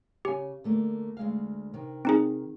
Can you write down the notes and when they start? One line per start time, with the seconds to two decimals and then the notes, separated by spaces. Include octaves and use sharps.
0.25 C#3 G4 G#5
0.64 D3 A3 A#3
1.17 D2 G#3 F5
1.74 C3 D#3
2.05 C4 D#4 G#4